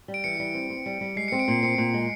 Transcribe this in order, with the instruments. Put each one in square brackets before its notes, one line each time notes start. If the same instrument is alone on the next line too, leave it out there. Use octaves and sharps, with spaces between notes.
[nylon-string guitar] G3
[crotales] D7
[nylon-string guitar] E3 [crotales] C#7
[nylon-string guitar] G3
C4
C4
G3
G3
[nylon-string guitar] G#3 [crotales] C7
[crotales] C#7
[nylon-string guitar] C4
[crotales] D7
[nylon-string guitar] A#2 [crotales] C#7
[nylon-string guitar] C4 [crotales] C#7
[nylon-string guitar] A#2
G#3